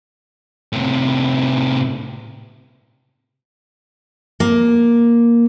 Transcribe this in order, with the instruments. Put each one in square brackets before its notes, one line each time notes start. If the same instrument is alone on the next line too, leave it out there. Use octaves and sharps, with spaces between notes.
[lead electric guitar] A2 C3
[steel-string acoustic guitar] A#3